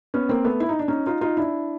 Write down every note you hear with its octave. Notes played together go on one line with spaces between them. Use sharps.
B3 C#4
A#3 C4
A3 B3
E4
D#4
D4
C#4 D#4
D#4 F4
D#4 F4
D4 E4